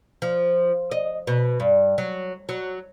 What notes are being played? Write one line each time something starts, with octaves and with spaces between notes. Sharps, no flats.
F3
D#5
B2
G2
F#3
F#3